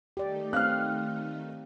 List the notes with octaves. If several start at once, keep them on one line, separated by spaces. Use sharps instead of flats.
D#3 A3 D#4 G4 D5
C4 F5 F6 F#6